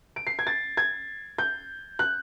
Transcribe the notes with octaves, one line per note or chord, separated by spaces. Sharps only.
D7
C7
G#6
A6
G#6
G6
F#6